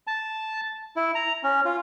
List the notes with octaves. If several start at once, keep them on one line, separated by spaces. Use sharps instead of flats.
A5
E4
A#5
C#4
F4